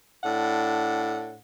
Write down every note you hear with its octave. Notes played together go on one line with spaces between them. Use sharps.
A2 D4 F#5